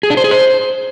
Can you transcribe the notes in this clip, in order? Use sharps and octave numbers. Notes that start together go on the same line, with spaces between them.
G#4
D4
C5
G#4
C5